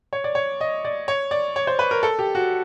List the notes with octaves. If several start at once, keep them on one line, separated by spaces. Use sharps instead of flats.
C#5
D5
C#5
D#5
D5
C#5
D5
C#5
C5
B4
A#4
A4
G4
F#4